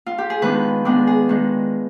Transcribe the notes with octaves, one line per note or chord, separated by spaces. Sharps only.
F4
G4
G#4
D#3 G#3 B3 D4 B4
D#3 G#3 B3 D4 D5
G#4
D#3 G#3 D4